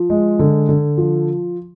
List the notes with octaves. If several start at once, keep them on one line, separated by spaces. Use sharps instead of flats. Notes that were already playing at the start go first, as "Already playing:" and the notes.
Already playing: F3
G#3
D3
D3
F3